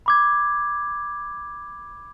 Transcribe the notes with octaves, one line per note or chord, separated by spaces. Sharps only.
B5 D6 G#6